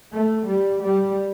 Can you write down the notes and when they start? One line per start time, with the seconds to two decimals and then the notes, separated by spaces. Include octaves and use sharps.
0.12 A3
0.47 G3
0.82 G3